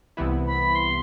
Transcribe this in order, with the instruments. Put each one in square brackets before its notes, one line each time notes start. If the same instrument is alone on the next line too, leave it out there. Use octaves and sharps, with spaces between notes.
[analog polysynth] C2 C3 E3 B3 E4
[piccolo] B5
C6